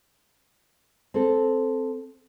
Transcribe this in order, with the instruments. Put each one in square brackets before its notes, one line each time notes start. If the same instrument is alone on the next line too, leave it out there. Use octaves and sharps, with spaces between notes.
[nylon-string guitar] C4 A4